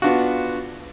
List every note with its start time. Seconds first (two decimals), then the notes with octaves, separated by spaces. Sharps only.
0.02 B3 D4 F4 F#4